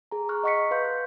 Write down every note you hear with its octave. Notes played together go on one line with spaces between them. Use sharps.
G#4 A#5
A#5 C#6 F6 F#6
D#5 F#5 C#6 F#6 B6 C#7
B4 F5 C6 G6
F#6